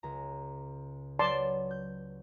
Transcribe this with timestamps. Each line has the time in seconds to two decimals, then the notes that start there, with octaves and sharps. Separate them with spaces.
0.03 C#2 A#5
1.19 F#3 B4 C#5 D5 A5 C6
1.71 G6